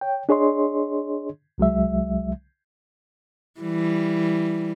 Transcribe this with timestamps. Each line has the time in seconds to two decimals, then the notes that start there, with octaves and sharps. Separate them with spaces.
0.01 C#5 G5
0.29 D4 G#4 C#5 D#5 C6
1.58 C2 F#3 G#3 E5
3.60 E3 G3